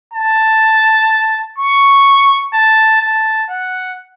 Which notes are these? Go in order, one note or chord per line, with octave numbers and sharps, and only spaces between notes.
A5
C#6
A5
A5
F#5